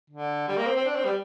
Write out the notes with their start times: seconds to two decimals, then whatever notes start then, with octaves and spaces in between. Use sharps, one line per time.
0.10 D3
0.48 G3
0.57 A#3
0.66 C4
0.76 C4
0.85 D4
0.95 C4
1.05 G3